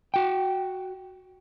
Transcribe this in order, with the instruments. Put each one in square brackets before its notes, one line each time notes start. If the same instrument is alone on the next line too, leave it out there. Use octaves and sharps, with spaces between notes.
[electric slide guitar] F#4 G5